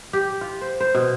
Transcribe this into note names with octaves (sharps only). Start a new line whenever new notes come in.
G4
F4
C5
C5
B2